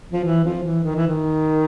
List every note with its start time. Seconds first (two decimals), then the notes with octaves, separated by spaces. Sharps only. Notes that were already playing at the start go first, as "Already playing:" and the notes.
0.12 F3
0.24 E3
0.44 F3
0.63 E3
0.83 D#3
0.95 E3
1.07 D#3